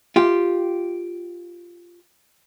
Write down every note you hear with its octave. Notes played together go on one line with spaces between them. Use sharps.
F4 G4